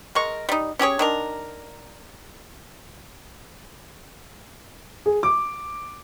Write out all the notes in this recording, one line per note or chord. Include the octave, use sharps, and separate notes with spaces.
G#3 A#4 C#6
G3 D#4
C#4 G4 G#4 C#5
D#3 D4 A#4
G#4
D6